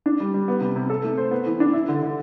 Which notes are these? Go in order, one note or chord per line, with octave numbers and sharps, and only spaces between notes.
D4
G3
G3
B3
C3
C3
A4
A3
C5
B3
E3
D4
E4
D3
D3